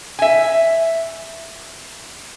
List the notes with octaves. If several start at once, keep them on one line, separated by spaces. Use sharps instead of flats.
E5 G#5